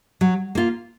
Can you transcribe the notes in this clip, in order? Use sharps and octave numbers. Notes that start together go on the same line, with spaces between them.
F#3
A#3 F4